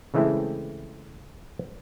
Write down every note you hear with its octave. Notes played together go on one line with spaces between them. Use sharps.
C#3 E3 G#3 A3 C4 E4